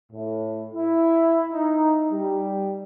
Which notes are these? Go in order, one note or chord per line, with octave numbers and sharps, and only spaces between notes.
A2
E4
D#4
G3